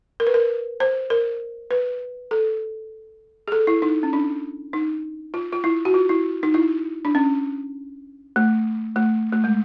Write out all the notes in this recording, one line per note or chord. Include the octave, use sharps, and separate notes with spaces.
A#4
B4
A#4
C5
A#4
B4
A4
G#4
A4
E4
D#4
C#4
D4
D#4
F4
F4
E4
F#4
F4
E4
D#4
E4
D4
C#4
A3
A3
A3
G#3